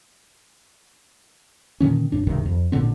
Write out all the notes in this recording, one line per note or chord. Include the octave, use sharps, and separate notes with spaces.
A#2 D3 D#3 C#4
A1 G2 D4
C#2 G2 C3 D#3
F2
A1 A#2 D3 C4